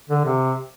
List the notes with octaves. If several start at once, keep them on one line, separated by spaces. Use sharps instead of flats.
D3
C3